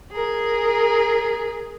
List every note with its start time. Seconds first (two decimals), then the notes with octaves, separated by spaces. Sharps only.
0.12 G#4 A#4